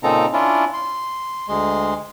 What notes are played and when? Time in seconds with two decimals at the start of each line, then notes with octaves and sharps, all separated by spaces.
0.03 A#2 C#3 C4 D#4 A4 A#5
0.33 C#4 D4 E4 F4
0.74 C6
1.49 D2 G#3 C6